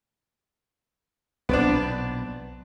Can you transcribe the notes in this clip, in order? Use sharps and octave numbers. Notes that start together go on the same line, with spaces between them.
B1 A#2 B3 C4 D4